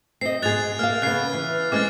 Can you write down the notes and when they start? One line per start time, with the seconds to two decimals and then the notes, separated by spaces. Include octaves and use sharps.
0.21 C4 D#5 C7
0.42 G#2 G#3 G#4 F#6 A6 F7
0.79 A#3 F5 F6
1.02 C#3 B3 F#6 C7
1.33 E3
1.72 G#3 C4 C#4 D6 F6 A6